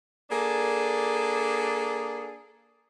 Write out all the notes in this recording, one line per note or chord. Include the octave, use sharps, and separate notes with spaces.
A#3 D4 G#4 A4